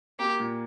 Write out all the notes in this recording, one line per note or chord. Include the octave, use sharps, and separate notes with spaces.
A#3 G4
A#2